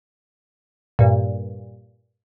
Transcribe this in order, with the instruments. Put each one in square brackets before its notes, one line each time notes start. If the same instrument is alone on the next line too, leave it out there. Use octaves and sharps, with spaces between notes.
[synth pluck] G2 A#2